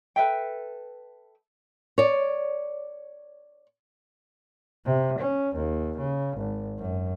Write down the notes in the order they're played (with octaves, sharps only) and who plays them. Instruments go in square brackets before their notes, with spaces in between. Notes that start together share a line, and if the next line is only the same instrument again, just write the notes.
[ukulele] A4 B4 E5 G5
[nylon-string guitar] C#5 D5
[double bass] C3
C#4
D#2
C#3
G#1
F#2